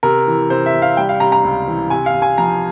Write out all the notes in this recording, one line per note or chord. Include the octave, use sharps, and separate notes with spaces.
C3 A#4
E3
C3 C5
E5
C3
F5
G3 G5
F5
C3 A#5
A#5
C#2
E3
C3 G#5
F5
C3
G#5
F3 A#5